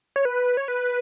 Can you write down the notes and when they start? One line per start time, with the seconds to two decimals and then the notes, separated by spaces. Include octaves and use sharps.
0.16 C#5
0.25 B4
0.57 C#5
0.68 B4